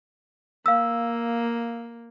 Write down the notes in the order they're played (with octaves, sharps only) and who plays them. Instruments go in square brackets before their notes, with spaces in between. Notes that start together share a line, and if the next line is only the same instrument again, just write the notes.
[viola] A#3 [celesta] F5 E6